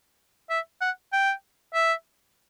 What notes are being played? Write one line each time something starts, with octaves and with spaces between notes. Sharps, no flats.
E5
F#5
G5
E5